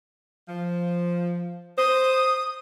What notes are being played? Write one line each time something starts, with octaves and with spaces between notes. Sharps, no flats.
F3
C5 D#6